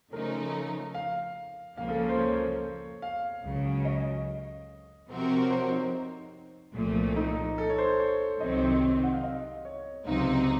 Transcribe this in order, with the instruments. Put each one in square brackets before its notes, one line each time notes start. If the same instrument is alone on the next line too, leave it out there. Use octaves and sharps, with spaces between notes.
[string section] C#3 F3 A3 D#4 [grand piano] A#4
[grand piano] F5
[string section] C#2 C#3 F3 A#3 [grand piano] F5
[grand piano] A4
C5
C#5
F5
[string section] C#2 C#3 F#3
[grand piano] D#5
[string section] C3 F3 C4 F#4 A#4
[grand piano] C#5
C5
D#4
[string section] C2 A#2 F3 A3
[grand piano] D#4
A4
C#5
C5
C#5
[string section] C2 C3 D#3 F#3 C4 [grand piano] D#5
[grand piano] F#5
F5
D#5
C#5
[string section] C#2 C3 F#3 C4 D#4 [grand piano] F5